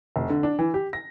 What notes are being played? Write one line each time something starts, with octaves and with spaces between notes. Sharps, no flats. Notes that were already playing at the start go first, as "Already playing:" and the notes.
F1
D3
D4
E3
G4
A#6